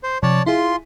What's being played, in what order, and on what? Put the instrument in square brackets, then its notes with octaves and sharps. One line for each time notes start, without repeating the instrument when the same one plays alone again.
[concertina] C5
[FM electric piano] C3 F3 [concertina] C#5 D5 A5
[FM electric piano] E4 G#4 [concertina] F4 C6